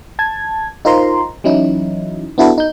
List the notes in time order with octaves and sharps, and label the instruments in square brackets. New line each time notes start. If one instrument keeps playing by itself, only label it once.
[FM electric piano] A5 G#6
D#4 F4 A#4 C5 A#5 C6
E3 F#3 C#4 D#4 E4
B3 D4 E4 F#4 A4 B4
D#4 G6